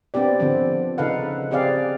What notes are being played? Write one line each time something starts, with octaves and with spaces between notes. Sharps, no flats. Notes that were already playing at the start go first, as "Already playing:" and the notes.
B3 C4 D4 G4 D5
D3 F3 C4
C#3 D#4 A4 B4 F5 F#5
C4 G4 G#4 D5 F5